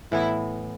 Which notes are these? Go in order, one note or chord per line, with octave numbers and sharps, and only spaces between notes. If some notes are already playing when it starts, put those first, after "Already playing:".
A2 E3 B3 E4